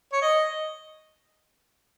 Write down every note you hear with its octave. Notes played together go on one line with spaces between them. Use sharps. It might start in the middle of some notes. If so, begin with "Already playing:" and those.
C#5
D#5